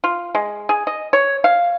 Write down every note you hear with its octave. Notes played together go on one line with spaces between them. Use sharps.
F4
G#3
G#4
D#5
C#5
F5